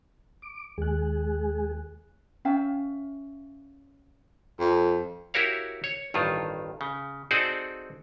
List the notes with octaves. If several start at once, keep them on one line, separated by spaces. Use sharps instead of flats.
D6
D#2 G#3 G#4 F#6
C#4 E5 F5 G5
F2
E4 F#4 G4 A#4 C#5 F5
C#5
A1 G2 D#3 F4
C#3
C4 D#4 F#4 G#4 A4 D5